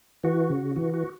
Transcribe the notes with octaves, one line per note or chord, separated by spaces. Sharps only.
E3 F#4
C#3
E3 F#4
F#4